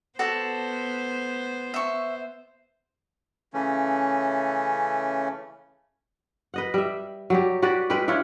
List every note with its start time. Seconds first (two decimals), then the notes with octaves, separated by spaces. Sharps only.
0.19 B3 F#4 A4 C5 D5
1.74 E5 C#6
3.54 C#3 E3 A3 C#4
6.54 B4 D#5 F#5
6.74 G3 E5
7.30 F#3 G3 G4
7.62 F#4 G4 B4 D5
7.90 G3 G#3 G4 B4
8.08 D4 E4 F4 C#5